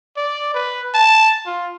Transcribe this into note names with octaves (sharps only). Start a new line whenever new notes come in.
D5
B4
A5
F4